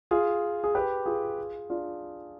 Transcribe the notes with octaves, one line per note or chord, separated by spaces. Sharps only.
F4 G#4
G#4
G4 B4
F4 G#4
D4 F4